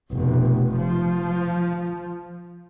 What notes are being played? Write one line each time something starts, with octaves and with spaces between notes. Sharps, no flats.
F1 B2
F3